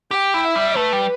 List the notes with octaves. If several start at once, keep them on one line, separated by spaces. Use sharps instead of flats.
G4 G5
E4
E5
G3
A3 B4
G3